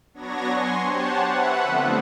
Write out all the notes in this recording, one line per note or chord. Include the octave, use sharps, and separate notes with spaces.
F#3 B3 D4 C#5 G#6 A#6
G#5 C6 C#6
G4 C5 C#5 F#5 A5
B4 E5 F#5
D3 F3 G3 A3 B3 C4